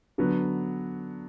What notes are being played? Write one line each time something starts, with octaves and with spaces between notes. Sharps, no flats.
D3 F#3 B3